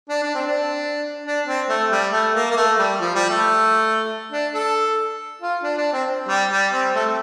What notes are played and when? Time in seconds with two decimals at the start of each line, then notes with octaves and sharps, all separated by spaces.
0.09 D4
0.23 D4
0.34 C4
0.46 D4
1.26 D4
1.47 C4
1.69 A3
1.92 G3
2.12 A3
2.35 A#3
2.51 A#3
2.56 A3
2.78 G3
3.01 F3
3.15 G3
3.30 A3
4.32 D4
4.54 A4
5.42 F4
5.63 D4
5.77 D4
5.93 C4
6.28 G3
6.51 G3
6.73 C4
6.95 A3